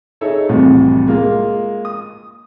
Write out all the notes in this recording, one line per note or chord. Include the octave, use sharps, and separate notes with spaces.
D#4 G#4 A4 C#5 E5
C2 F2 A2 C3 E3 F#4
G#3 A#3 F4
D#6